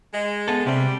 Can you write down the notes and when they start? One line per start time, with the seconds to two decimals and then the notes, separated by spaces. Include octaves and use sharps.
0.13 G#3
0.48 B3 A4
0.66 C3 G3